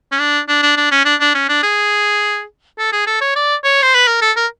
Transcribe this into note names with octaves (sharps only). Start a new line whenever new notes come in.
C#4
D4
D4
D4
D4
C#4
D4
D4
C#4
D4
G#4
A4
G#4
A4
C#5
D5
C#5
C5
B4
A#4
A4
A#4